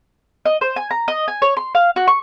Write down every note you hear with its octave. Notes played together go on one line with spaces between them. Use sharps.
D#5
C5
G#5
A#5
D#5
G#5
C#5
C6
F5
F#4
C#6